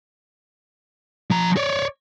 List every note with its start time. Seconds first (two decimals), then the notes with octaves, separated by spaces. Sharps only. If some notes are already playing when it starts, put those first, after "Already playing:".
1.31 F3 A#5
1.57 C#5 D5